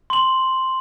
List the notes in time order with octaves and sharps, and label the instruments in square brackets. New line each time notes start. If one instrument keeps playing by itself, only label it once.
[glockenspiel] C6 F#7